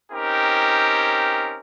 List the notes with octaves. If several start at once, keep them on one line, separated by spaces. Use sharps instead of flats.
C4 C#4 D#4 G4 A#4